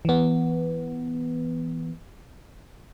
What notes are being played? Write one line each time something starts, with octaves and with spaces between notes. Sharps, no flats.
E3 B3